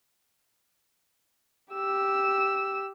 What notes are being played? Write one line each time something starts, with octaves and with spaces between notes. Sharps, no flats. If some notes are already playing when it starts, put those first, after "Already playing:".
G4 E6